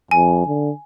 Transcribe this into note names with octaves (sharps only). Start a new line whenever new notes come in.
F2 G#5
D3